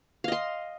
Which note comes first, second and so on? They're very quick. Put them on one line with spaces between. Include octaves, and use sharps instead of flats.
F5 D#5 C6